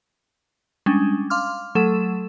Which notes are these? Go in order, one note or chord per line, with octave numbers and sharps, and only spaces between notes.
G3 G#3 C#4 D4
F5 C6 D6 F6
F#3 A3 A4 E7